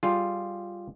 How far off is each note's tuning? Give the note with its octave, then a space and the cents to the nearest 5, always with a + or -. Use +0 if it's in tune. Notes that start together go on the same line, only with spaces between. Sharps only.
G3 +0 F4 +0 G#4 +0